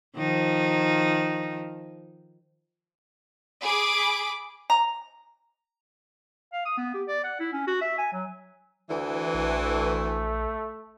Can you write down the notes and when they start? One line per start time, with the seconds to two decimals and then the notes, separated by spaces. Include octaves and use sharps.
0.17 D#3 F3 D#4
3.61 G#4 B5 D6
4.70 A#5
6.53 F5
6.65 D#6
6.77 B3
6.94 G4
7.08 D5
7.24 F#5
7.39 E4
7.53 C#4
7.67 F#4
7.81 E5
7.98 G#5
8.13 F#3
8.90 D2 E3
9.34 A#1 A3